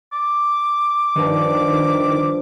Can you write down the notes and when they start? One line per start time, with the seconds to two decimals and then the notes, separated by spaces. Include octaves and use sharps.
0.13 D6
1.16 G2 D#3 F3